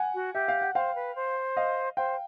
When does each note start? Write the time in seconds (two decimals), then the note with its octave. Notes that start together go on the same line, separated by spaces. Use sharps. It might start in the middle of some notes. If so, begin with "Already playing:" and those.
Already playing: F#5 G#5
0.14 F#4
0.34 G4 E5
0.48 F5
0.61 F#5
0.75 C5 F5 G5
0.95 B4
1.16 C5
1.57 D#5 F5
1.97 C5 F5 G5